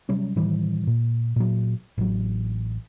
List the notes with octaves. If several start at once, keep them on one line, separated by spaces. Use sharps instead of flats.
C3 F#3 G3 C#4
A2 D#3 E3 G3
A#2
A#2 F#3
A1 F#3